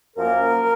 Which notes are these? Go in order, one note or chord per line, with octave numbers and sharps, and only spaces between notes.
F#2 F3 A#3 A#4